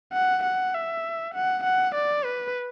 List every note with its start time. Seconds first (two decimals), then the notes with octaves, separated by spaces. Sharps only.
0.13 F#5
0.44 F#5
0.74 E5
1.35 F#5
1.64 F#5
1.95 D5
2.25 B4